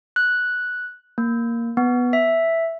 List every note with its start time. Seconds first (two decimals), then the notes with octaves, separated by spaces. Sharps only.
0.16 F#6
1.18 A#3
1.77 B3
2.13 E5